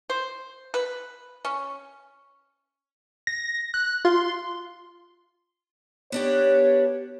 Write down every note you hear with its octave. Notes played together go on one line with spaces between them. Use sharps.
C5
B4
C#4
A#6
F#6
F4 C6
B3 D4 G4 C#5